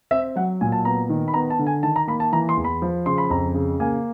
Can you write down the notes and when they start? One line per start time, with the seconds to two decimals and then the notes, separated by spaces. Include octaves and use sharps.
0.11 C4 E5
0.36 F#3 F#5
0.61 A#2 G#5
0.72 A5
0.85 B3 A#5
1.10 D#3
1.28 B5
1.34 B3 A#5
1.50 A5
1.59 D3
1.67 G#5
1.83 D#3 A5
1.96 A#5
2.08 A#3 B5
2.20 A5
2.32 E3 A#5
2.49 C6
2.57 E2
2.64 B5
2.82 F3
3.06 C#3 C6
3.18 B5
3.30 F2 A#5
3.54 C#3
3.80 A#3 G#5